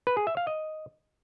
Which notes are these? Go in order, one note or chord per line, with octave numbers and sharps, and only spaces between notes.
B4
G#4
E5
F5
D#5